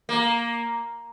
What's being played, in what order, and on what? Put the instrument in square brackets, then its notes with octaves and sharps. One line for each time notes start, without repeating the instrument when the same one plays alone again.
[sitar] A#3